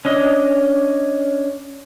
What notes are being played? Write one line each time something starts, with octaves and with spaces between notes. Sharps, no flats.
C#4 D4 D#5